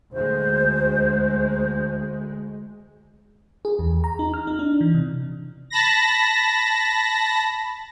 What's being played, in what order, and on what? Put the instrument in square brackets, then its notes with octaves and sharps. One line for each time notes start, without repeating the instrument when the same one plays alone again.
[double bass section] D2 G#3 [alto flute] C5
[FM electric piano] G#4
E2
A#5
D#4
F6
D#4
D4
E3
C3
[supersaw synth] A5 B5 A#6